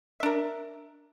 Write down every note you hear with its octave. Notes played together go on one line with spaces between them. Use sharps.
D4 A#4 E5